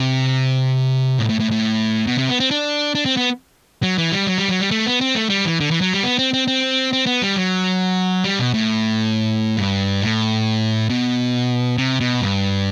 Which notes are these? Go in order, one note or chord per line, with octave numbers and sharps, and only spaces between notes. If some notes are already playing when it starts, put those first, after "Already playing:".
Already playing: C3
A2
A2
A2
A2
B2
C3
B3
C4
D4
D4
C4
B3
F#3
E3
G3
F#3
G3
F#3
G3
A3
B3
C4
A3
G3
E3
D3
E3
F#3
G3
B3
C4
C4
C4
C4
B3
G3
F#3
G3
B2
A2
G2
A2
B2
C3
B2
G2